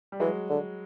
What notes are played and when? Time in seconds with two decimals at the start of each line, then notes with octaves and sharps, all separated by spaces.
0.12 G3
0.20 E3 F#3 G#3
0.50 D3